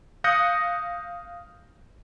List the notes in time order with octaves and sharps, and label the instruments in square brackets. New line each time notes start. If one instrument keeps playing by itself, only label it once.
[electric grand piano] F5 D#6 F#6 G6 A#6 C#7